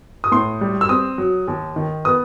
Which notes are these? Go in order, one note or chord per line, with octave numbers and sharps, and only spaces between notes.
D#6
A2 C6
G3
E6
C4 D#6
F#3
D#2
D#3
B3 D#6